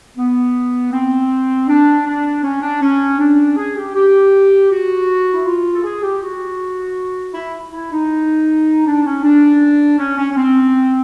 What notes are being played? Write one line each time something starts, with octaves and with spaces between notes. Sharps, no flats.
B3
C4
D4
D4
C#4
D4
C#4
D4
G#4
G4
G4
F#4
E4
F4
A4
G#4
G4
F#4
E4
E4
D#4
D4
C#4
D4
C#4
C#4
C#4
C4